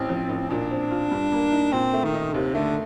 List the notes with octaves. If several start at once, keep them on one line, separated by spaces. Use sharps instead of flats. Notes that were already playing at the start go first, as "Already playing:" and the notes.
Already playing: A1 C4
F3
A1
A#2 D4
C4
F4
G2
A#3
D#4
A#2 C4
A3
D#3
D#4
D#2 C3
D3 A3